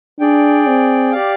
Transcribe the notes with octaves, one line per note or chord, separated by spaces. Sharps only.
D4 G#4 D5 G5
C4
G4 D5 F5